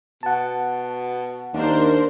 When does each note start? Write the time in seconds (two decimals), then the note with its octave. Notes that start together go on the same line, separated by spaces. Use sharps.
0.23 B2 F#5 A5
1.53 D#2 D4 A#4 C5